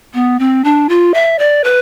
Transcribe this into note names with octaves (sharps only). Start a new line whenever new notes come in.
B3
C4
D4
F4
E5
D5
B4